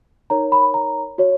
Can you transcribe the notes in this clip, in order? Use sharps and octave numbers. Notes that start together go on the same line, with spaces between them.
D#4 A#4 C#5 A#5
B5
A#5
F#4 C#5